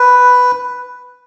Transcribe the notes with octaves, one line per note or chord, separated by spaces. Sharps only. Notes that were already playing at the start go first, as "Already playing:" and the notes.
Already playing: B4